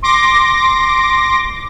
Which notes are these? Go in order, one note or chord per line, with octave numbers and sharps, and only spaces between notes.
C6 D6 A#6